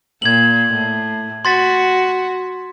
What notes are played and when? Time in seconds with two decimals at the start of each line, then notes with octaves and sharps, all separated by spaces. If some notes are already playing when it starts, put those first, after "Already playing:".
0.22 A#2 G#6 F#7
0.73 A2
1.45 F#4 C6 A6 B6